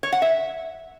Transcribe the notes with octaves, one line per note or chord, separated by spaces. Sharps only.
C#5
F#5
E5